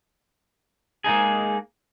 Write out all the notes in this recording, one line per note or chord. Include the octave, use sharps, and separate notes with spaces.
G#3 A#3 D#4 G#4